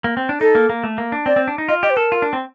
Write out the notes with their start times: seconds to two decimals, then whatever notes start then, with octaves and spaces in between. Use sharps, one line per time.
0.04 A#3
0.17 C4
0.29 D4
0.41 D#4 A4
0.55 A#3
0.70 A#3
0.84 A3
0.98 A#3
1.12 D4
1.26 C4 D5
1.36 C4
1.48 D4
1.58 D#4
1.69 F4 D#5
1.83 G4 D#5
1.90 C5
1.97 A4 A#4
2.12 F4
2.22 D4
2.33 C4